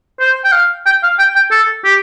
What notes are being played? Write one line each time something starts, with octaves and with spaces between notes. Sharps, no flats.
C5
G5
F5
G5
F5
G5
G5
A4
G4